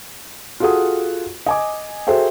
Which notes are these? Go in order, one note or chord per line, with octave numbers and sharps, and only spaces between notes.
F4 F#4 G#4 A4 F#5 D#6
D#5 G#5 D6
F#4 G#4 A4 C5 E5 G5